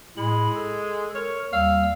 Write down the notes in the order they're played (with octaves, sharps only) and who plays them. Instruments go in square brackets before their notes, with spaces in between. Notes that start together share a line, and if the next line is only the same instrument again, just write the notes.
[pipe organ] A2 B5 [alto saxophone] G#3
[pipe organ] A4
[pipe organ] A#4 [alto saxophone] C#5
[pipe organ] D#2 G3 E6 [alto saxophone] F5